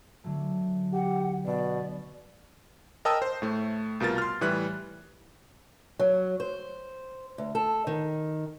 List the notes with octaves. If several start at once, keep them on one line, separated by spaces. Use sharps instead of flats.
D3 F#3 A3
G4 F#5
B2 D5
A#4 D#5 G5 A5 D#6 E6
C5
A2 A3
C2 B2 F4 A#4 A6
C6 F6
A2 E3 G3 F#6
F#3
C5
D2
A4
D#3